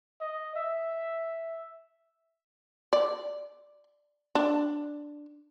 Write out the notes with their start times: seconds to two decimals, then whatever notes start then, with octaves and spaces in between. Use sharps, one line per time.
0.21 D#5
0.56 E5
2.93 D5
4.35 D4